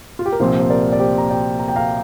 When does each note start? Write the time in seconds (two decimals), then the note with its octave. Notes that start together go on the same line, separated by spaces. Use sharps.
0.19 F4
0.26 G4
0.32 A#4
0.40 C2 A#2 F3 C4 G4 C5
0.59 C5
0.70 A#4 D5
0.93 D5
1.00 G4 C5
1.18 A#5
1.30 D5 G5
1.59 A#5
1.68 G5
1.76 F5 A#5